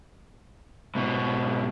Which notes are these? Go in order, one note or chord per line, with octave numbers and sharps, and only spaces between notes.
G#2 B2